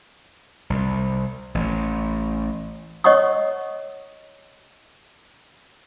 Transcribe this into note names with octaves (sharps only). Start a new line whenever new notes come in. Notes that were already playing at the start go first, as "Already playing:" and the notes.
C2
A1
C#5 D#5 F#5 C#6 D#6